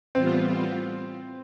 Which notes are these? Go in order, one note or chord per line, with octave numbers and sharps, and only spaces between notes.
A2 E3 G3 B3 C4 F4